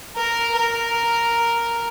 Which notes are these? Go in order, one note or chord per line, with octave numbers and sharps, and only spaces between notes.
A#4
A#4